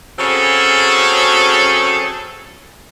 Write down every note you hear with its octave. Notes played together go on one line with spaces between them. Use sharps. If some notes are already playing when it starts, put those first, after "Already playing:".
C#3 F#3 C4 C#4 G#4 A4